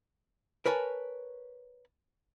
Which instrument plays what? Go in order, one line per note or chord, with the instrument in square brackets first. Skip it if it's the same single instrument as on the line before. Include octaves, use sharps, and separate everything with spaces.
[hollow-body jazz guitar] A#4 B4 C#5 G#5 A5